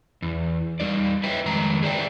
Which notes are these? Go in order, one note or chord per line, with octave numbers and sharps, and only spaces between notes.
E2
G3 D#4 D5
B4 C#5 E5 G5
F2 D#3 G#3 A#5
G#4 B4 C5 D5 E5 G5